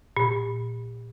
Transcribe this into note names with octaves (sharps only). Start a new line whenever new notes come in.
A#2